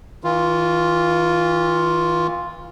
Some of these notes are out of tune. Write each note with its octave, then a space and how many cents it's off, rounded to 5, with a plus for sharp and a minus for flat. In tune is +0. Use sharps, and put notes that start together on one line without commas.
E3 -35 F4 +0